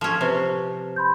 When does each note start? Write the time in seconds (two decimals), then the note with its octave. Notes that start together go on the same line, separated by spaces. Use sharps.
0.01 F3 C#4
0.21 C3 B4 C5
0.96 B5 C6 G6